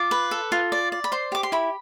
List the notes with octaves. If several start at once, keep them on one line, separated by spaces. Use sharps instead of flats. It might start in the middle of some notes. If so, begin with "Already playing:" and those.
Already playing: F4 D6
B4
A4
F4
D5
D5
B5
C5 C6
G4 D6
C6
E4 B5